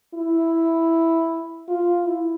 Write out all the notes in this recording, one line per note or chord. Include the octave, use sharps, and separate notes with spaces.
E4
F4
E4